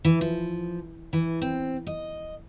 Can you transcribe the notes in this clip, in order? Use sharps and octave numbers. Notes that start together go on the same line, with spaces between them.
E3
F3
E3
C4
D#5